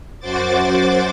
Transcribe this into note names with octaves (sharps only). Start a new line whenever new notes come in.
F#2 F#4 C5 D6 A6